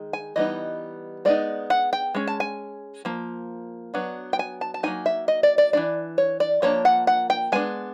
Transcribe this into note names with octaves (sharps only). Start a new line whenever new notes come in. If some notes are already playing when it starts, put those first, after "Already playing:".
Already playing: D#3 G#3
G#5
E3 G3 B3 D#4 D#5
G#3 B3 D#4 D5
F#5
G5
G#3 C#4
A5
G#5
F3 A#3
F#3 B3 D4
G5
G#5
A5
A5
F#3 A#3 D#4 G#5
E5
D#5
D5
D5
E3 A3 D4 D5
C#5
D5
F3 A#3 D4 C#5
F#5
F#5
G5
G#3 B3 D4 G#5